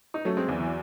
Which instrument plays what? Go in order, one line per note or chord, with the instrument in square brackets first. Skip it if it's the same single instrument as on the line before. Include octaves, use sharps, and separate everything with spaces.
[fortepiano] D#4
[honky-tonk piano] F#3 [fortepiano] A3 C#4
[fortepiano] G#3 C4
[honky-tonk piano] E2 [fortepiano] E3
[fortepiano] E3